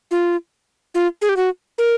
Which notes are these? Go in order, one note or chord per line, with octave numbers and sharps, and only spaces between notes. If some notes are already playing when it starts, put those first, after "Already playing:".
F4
F4
G#4
G4
F#4
A#4